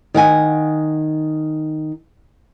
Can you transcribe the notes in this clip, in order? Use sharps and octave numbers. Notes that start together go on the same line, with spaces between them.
D#3 F#5 G#5